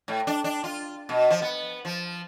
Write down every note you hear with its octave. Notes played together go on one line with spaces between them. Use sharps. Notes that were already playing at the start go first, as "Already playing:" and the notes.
A2
D4
D4
F4
B2
F3
B3
F3